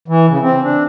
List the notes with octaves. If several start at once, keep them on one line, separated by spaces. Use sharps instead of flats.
E3
C#3
C4
D4